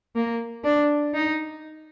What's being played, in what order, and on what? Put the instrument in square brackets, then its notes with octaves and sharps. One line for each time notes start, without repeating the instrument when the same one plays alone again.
[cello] A#3
D4
D#4